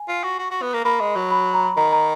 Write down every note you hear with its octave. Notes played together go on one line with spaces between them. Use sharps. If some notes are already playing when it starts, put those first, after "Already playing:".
Already playing: G#5
F4
F#4
F#4
F#4
B3
A#3
A#3 B5
G#3
F#3
B5
A#5
D#3 A#5
A#5